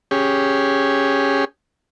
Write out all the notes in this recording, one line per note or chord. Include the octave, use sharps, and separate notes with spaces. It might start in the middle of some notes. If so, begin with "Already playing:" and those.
C#4 G4 G#4